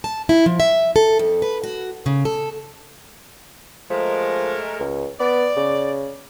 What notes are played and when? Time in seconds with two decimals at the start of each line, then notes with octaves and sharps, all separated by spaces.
0.04 A5
0.29 E4
0.46 F3
0.60 E5
0.96 A4
1.19 F2
1.42 B4
1.64 F#4
2.06 C#3
2.25 A4
3.90 F3 G#3 A3 A#4
4.80 C#2
5.20 B3 D5
5.56 C#3